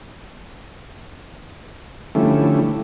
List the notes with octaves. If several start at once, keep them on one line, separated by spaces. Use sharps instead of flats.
D3 F3 G3 A3 C#4 E4